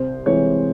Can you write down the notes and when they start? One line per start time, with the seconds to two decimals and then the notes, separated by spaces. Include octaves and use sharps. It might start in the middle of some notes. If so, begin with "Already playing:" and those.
Already playing: C2 C5
0.26 C3 E3 G#3 C#5